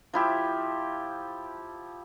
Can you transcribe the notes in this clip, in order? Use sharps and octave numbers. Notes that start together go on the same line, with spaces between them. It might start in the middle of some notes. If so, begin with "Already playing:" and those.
F3 E4 G4